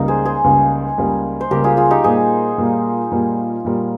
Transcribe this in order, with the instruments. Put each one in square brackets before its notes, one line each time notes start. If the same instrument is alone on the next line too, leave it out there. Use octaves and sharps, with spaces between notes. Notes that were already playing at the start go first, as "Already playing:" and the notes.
Already playing: [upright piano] C#2 C#3 G3 A#3 [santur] D#4
[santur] G#4 C5
G#4 C5
[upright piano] C#2 C#3 G3 A#3
C#2 C#3 G3 A#3
[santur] C5
[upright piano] C#2 C#3 G3 A#3 [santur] G4 A#4
[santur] F4 G#4
F4 G#4
D#4 G4
[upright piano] A#2 G3 A#3 [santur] G#4 C5
[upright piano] A#2 G3 A#3
A#2 G3 A#3
A#2 G3 A#3